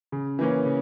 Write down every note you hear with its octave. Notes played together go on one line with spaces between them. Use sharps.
C#3
E3 A#3 C#4
C#3